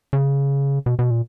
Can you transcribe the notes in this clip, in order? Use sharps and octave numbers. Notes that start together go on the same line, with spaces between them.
C#3
B2
B2
A#2